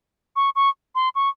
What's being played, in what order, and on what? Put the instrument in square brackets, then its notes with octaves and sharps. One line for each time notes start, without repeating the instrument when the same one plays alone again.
[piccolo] C#6
C#6
C6
C#6